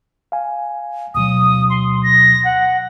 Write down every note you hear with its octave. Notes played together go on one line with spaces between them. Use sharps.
F5 G#5
D2 B2 F#3 D#6
C6
A#6
F#5